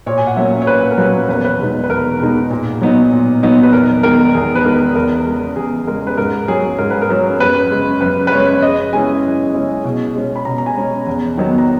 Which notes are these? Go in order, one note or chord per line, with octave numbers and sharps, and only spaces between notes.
A#2 C#5
G#5
F#5
F#3 A#3 C#4 E5
C#5
A#2 B4
A#4
F#3 A#3 C#4 B4
E2 B4
C#5
B4
B2 G#3 D#4
B4
E2 A#4
B2 G#3 D#4
A#2
F#3 B3 D#4
A#2
F#3 B3 D#4
B4
E2 A#4
D#3 G#3 B3 A#4
E2 G#4
B4
D#3 G#3 B3 A#4
E2 A#4
C#3 G#3
E2 G#4
C#3 G#3 A#4
B4
G#2 A#4
F#3 C#4 G#4
G#2 A#4
B4
A#4
F#3 C#4
F#2 B4
C#3 G#3
F#2 B4
B4
C#3 G#3 C#5
C#5
F#2 D#5
C#3 G#3 C#4 E4 G#5
F#2
C#3 G#3 C#4 E4
B2
G#3 C#4
B5
B2 A#5
A#5
G#5
G#3 C#4
E2
D#3 F#3 B3 D#4
A#5